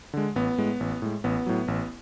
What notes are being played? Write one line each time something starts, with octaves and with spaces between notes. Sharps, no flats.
D3 G#3
A1 B3
A2 G#3
A1
A2 G#3
A1 B3
A2 F#3
A1